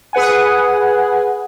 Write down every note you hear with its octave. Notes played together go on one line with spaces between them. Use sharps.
G#4 B4 F#5 G#5